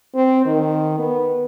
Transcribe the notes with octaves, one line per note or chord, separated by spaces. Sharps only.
C4
D#3
B3